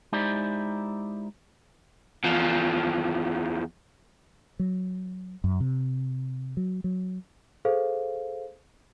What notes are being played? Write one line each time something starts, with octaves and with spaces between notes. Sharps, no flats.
G#3 D#4 E4 G4 C5 D5
E2 F3
F#3
F#2
C3
F#3
F#3
G#4 A4 C5 F5